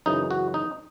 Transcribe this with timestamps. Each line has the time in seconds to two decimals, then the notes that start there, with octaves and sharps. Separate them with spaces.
0.06 F#2 C#3 E3 D#4
0.31 F#4
0.54 D#4